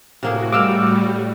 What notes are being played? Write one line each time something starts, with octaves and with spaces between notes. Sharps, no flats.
A2 C3 A#3 F#4 G#4
G3 G#3 A#3 D6 E6 F6